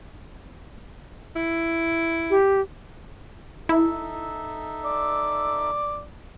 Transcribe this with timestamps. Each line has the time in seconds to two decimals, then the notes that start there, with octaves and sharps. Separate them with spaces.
1.35 E4
2.30 G4
3.69 D#4 E4 A4 E5
4.85 D5